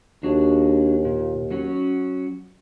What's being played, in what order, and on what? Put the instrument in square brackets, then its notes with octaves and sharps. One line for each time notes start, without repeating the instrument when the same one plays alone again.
[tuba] D#2 [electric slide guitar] D4 F#4 G#4
[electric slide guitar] A#2
F#3 C#4 F#4